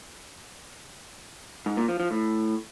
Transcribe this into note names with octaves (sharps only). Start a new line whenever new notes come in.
G#2
A#2
F3
F3
A2